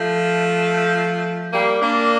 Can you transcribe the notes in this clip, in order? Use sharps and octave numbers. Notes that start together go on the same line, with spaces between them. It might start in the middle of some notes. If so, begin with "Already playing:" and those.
Already playing: F3 A3
G3 A#3
A#3 D4